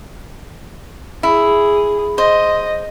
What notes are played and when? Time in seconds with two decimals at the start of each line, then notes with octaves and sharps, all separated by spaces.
1.23 E4 G#4
2.18 C5 D#5